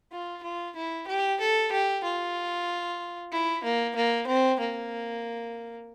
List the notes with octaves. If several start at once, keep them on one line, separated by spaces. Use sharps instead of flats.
F4
F4
E4
G4
A4
G4
F4
E4
A#3
A#3
C4
A#3